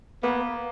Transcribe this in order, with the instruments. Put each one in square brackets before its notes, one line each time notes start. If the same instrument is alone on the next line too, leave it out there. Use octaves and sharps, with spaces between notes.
[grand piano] A#3 [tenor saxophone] B3